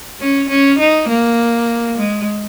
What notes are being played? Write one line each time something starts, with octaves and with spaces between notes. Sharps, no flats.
C#4
C#4
D#4
A#3
G#3